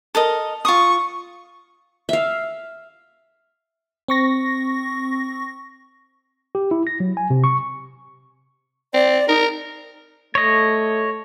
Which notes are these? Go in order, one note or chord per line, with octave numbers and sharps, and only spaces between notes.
A4 A#4 D#5
F4 C#6 D#6
E5 F5
C4 C#6 A#6
G4
E4
A#6
F#3
G#5
C3
C#6
C4 D5
D#4 A#4
A3 C#5 D#5